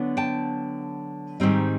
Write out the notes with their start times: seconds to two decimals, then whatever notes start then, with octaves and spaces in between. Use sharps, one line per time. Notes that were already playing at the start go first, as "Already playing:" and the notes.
Already playing: D3 F#3 B3
0.17 G5 A5
1.40 G#2 D#3 G3 C4 D#4